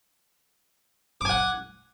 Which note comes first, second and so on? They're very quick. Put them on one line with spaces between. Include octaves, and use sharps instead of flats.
D6 G#5 F#5